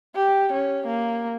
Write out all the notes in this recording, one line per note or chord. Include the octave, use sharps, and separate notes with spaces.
G4
C#4
A#3